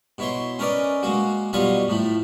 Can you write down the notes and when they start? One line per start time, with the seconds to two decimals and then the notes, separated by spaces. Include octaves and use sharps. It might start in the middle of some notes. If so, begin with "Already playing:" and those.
0.18 B2 E4 C#5 C6
0.59 C#4 A#4 B4 D5 D#5
1.03 G#3 A#3 F#4
1.53 B2 F#3 G3 F4 D#5 C#6
1.88 A2 F3 A3